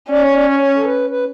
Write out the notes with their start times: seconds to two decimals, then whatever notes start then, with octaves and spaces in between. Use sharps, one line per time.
0.10 C#4 D5
0.23 C#5
0.35 D5
0.48 C#5
0.59 C#5
0.77 A4
0.84 B4
1.10 B4